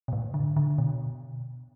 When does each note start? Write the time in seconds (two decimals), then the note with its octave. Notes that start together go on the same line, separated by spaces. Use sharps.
0.08 B2
0.13 A2
0.34 D3
0.57 D3
0.78 B2